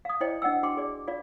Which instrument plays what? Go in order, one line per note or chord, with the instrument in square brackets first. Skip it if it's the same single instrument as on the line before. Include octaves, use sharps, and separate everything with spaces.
[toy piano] F5 D#6
E4 C5 D5 D#5 G5
D4 D#5 F#5 G5 E6
D4 F#4 G5 C6 D6
G#4 D5
F4 D5 F5